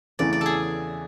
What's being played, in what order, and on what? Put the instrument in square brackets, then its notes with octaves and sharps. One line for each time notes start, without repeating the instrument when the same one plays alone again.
[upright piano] E2 C#3 E3 A3 [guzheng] D5
[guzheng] D5
G#4 A4